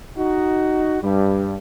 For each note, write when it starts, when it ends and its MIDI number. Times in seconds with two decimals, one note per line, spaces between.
0.17 0.98 63
0.17 0.98 66
1.02 1.56 43
1.02 1.56 55